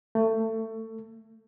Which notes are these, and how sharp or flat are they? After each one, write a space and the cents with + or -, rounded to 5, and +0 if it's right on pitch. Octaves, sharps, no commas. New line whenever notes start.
A3 +25